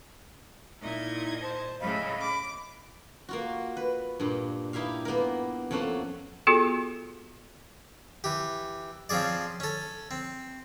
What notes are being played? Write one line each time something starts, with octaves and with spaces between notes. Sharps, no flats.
A#2 D#4 E4 D#5 G#6
C5 A5
A2 C#3 D#5 F5 B5
D6
A#3 F4 F#4
B4
G2 A#2
D#4 E4 G4 E5 F5
A#3 B3 G4 A#4
F2 A3 A#3 C#4 F#5 A5
B3 F4 F#4 G#4 A4
E3 G4
F3 C4 C#4 G#4 D5
C#4 A4
C4